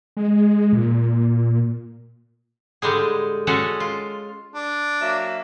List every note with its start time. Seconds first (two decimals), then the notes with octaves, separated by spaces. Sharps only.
0.17 G#3
0.73 A#2
2.82 A2 D3 G3 G#3 G#4
3.47 G#3 C#4 F#4 G#4 A4
3.80 F4
4.55 D4
5.00 F#3 A#3 E5